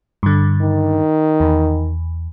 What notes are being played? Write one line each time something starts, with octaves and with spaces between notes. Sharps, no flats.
G2 D3
D#3
E2